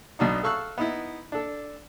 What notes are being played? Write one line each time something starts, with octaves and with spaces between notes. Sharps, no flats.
B1 B2 D4 D#4
A4 F5 C#6 E6 F#6
B3 D#4 E4
D4 A4